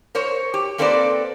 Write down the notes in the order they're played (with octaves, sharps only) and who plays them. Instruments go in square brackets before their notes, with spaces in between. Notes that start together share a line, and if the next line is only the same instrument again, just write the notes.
[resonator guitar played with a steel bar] A#4 C5 C#5
G4
A#3 C4 A4 B4 C5 D5